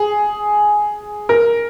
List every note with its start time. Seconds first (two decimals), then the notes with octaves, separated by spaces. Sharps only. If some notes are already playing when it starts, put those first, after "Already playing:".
Already playing: G#4
1.29 A#4